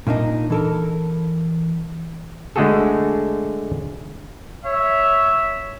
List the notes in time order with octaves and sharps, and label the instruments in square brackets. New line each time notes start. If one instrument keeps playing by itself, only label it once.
[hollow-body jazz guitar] A#2 A#3 D4 D#4
E3 A4 A#4
[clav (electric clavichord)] D3 G#3 A3 F#4 G#4 A4
[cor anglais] C#5 [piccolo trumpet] E5